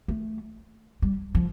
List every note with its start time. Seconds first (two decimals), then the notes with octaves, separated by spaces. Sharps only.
0.08 A3
1.02 G3
1.35 F3